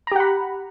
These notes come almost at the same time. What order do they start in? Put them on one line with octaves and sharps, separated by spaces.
A#5 G4 F#5 B5